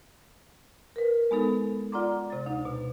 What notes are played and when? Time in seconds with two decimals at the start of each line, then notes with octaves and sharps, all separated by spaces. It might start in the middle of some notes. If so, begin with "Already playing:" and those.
0.96 A#4 B4
1.31 G#3 B3 D#4 A4
1.92 F4 D5 F#5 A#5 C6 D6
2.30 C3 A6
2.46 D2 D#4
2.65 B2